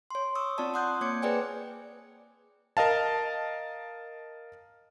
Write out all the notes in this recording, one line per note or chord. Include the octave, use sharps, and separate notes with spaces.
C#5 C6
C#6 D#6 E6
C4 F4 D5 A5
F#5 C6 D#6 F#6 G6
A#3 C#5 D6 G#6 C#7
G#4 B4 C5 D5 G5 G#5
A#4 D#5 F5 A5